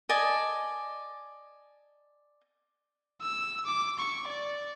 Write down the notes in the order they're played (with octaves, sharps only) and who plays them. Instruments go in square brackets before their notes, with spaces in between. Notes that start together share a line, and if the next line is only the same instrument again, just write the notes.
[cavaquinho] D5 D#5 G#5 A5
[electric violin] E6
D6
C#6
D5